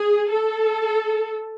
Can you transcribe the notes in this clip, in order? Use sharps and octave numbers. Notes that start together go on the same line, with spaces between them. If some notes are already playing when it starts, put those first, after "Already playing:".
Already playing: G#4
A4